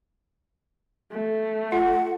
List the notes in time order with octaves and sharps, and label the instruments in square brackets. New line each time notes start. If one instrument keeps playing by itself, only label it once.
[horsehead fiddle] A3
[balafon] F4 [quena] F#5